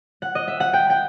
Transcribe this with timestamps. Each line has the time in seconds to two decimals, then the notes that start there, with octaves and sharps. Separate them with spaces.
0.22 F#5
0.35 D#5
0.48 E5
0.60 F#5
0.73 G5
0.90 G5